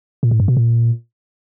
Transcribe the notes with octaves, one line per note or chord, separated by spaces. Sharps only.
A#2
A2
G2
B2
A#2